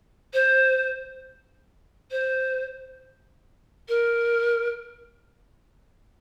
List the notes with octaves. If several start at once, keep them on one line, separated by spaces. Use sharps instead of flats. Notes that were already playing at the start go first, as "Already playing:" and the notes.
C5
C5
A#4